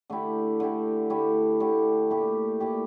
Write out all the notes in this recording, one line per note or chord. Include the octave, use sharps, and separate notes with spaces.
D3 A3 E4 G4
D3 A3 E4 G4
D3 A3 E4 G4
D3 A3 E4 G4
A#2 A3 E4 G4
A#2 A3 E4 G4